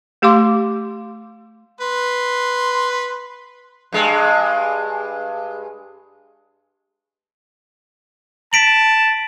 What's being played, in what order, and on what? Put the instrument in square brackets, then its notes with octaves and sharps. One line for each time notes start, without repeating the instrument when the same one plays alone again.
[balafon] A3 G4 F5 C6 D6
[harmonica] B4 C6
[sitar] G2 G#3
[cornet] A5 [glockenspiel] B6 D7 F#7